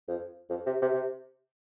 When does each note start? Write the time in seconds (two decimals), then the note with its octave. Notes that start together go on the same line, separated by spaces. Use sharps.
0.08 F2
0.50 F2
0.66 C3
0.82 C3
0.94 C3